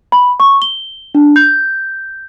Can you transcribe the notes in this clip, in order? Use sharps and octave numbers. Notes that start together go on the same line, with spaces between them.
B5
C#6
G7
D4
G6